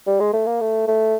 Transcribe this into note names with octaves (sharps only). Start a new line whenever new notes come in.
G3
G#3
A3
A#3
A3
A3